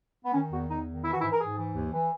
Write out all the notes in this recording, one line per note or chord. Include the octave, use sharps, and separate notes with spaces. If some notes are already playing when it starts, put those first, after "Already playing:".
B3
D#3 C#4
E2 F#4
E2 D#4
D#3
E3 E4
F#4
G#2 E4
A#4
G#2 G#4
E3
D#2
E3